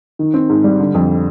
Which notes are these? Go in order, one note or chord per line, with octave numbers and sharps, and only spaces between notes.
D#3
C4
G#2
G3
D3
F2